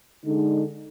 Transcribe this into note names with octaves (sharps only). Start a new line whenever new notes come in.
D3 G#3 D#4